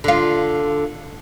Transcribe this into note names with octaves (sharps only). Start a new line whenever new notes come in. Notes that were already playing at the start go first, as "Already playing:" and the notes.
D3 F4